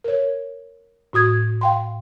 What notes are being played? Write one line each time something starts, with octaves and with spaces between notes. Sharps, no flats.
A#4 C#5
A2 F#4 D#6 G#6
F5 G5 C6